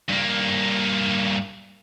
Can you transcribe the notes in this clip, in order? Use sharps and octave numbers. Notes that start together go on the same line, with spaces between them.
G2 A#3